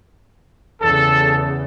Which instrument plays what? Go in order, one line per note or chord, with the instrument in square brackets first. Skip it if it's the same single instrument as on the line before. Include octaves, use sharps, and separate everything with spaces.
[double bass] E2 C#3 [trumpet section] A4